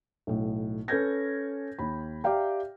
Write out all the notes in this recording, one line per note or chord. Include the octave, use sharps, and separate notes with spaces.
B1 A2
C#4 A4 B4 G6 G#6 A#6
D#2 B5
G4 D5 E5 F5 G5 A#5